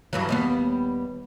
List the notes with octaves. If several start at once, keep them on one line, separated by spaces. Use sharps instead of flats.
G2 E3 F#3
D#2 G3 B3